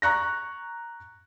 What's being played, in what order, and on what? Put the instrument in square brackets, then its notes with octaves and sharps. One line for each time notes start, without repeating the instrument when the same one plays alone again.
[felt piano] A#5 C#6 F#6 A#6